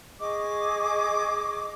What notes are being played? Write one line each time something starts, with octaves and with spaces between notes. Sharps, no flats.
G#4 D#5 C#6 D6